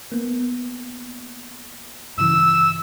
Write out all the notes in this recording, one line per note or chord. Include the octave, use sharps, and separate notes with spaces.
A#3 B3
G2 C#3 E3 E6